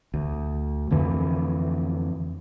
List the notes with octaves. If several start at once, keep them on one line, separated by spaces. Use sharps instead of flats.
D2
F2 D3 E3